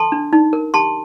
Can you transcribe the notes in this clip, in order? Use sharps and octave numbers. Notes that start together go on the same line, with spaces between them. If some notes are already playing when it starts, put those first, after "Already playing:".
Already playing: A4 A5 C6
D4
D#4
A#4
G4 A5 C6